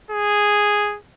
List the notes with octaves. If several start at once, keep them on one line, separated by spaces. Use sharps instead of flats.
G#4